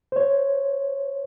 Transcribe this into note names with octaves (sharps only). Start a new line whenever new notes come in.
C5 C#5